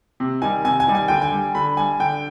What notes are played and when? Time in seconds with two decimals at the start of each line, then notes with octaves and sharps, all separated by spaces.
0.20 C3
0.42 D#3 G3 G#5
0.64 C3 G#5
0.80 G#5
0.87 D#3 G3
0.95 G#5
1.08 D3 G5
1.22 G#5
1.32 G3
1.55 D3 B5
1.77 G3 G#5
2.00 D3 G5